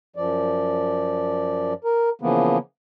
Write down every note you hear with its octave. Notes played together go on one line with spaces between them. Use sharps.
F#2 F3 D5
A#4
C#3 E3 F3 A#3 B3